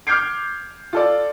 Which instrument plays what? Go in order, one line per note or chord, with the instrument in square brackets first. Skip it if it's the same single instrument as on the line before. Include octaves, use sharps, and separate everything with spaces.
[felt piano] D6 F6 G6 G#6 C7 D7
F4 A4 D5